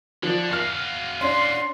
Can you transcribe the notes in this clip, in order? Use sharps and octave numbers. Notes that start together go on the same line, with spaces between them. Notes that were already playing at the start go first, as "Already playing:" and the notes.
D3 F3 D4
F#4 F5 F6 C7
C#4 D4 C6